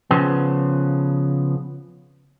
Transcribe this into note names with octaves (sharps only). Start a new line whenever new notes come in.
C#3 F3 B3